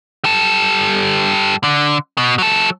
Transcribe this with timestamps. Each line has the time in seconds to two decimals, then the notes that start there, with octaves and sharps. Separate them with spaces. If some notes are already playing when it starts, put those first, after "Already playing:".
0.24 G3 A4
1.64 D3
2.18 B2
2.38 F#3 A4